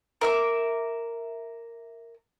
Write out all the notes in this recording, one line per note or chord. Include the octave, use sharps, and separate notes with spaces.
A#4 E5 D6